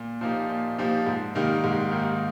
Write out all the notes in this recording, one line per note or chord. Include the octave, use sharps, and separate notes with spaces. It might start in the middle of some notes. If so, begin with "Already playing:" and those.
Already playing: A#2
F3 A#3 D#4 G4
A#2
F3 A#3 D#4 G4
G#2
D#3 G3 A#3 D#4
G#2
D#3 G3 A#3 D#4